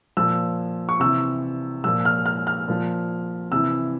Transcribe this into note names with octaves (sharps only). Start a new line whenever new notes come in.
A#2 F3 E6
C#6
C3 E3 E6
A#2 F3 E6
F6
F6
F6
A#2 F3
C3 E3 E6